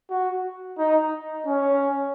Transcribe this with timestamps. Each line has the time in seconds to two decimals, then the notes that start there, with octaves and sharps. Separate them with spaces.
0.10 F#4
0.78 D#4
1.47 C#4